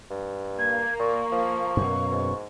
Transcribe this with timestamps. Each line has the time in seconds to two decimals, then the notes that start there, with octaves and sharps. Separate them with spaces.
0.10 G2
0.59 A#3 G#6
0.99 A#2 C#6
1.32 F3
1.77 F#2 B2
2.12 G#2